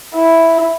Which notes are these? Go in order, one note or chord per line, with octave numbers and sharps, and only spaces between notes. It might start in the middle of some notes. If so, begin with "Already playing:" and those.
E4